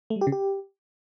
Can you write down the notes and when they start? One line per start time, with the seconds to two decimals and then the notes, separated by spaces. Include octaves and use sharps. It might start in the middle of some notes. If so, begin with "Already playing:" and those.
0.10 A3
0.16 G3
0.21 G4
0.27 C#3
0.32 G4